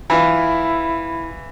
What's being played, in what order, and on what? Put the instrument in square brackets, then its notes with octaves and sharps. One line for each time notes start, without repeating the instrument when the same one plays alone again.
[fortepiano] E3 F4 [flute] E4